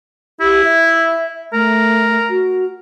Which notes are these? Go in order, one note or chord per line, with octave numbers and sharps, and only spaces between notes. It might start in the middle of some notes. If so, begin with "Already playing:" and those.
E4 G4
E5
A3 A#4
F#4